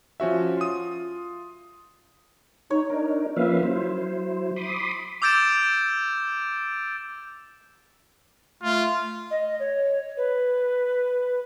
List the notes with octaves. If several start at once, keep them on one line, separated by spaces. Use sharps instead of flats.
F3 C#4 F#4 E5
F4 D#6
D#4 C#5
D4 D#4 A#4
F3 A#3 C#4 B4 E5 F5
F#3 E4 C5
B5 C6 D6 D#6
D6 E6 G6 A6 D7 E7
A3 F4
D#5
C#5
B4